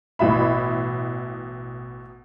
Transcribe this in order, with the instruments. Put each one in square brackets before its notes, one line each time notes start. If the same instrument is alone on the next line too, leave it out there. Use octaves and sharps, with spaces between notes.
[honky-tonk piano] A1 B2 E5 B5